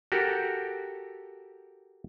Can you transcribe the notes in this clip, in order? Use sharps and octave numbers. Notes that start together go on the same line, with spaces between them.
F#4 G4 A4 A#4